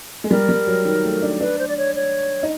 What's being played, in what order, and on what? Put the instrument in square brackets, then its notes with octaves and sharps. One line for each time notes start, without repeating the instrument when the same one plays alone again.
[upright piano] G#3
[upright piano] G3 [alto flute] A#4
[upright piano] G3
F#3
D#3
A3
D4
[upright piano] D4 [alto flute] B4
[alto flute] C5
D5
C#5
C#5
[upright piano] D#4